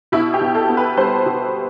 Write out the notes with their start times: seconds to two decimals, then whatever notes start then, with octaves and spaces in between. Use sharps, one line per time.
0.12 B2 E4
0.34 G4
0.41 B2
0.55 A4
0.69 B3
0.77 B4
0.97 G3 C5
1.26 B2